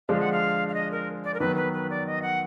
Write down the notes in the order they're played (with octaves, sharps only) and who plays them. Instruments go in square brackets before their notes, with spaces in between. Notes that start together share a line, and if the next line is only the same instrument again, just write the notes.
[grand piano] D3 F3 G#3 D4 [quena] F5
[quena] F#5
F5
F5
D#5
A#4
D5
A#4
[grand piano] D#3 F#3 B3 [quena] B4
[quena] B4
B4
D5
D#5
F#5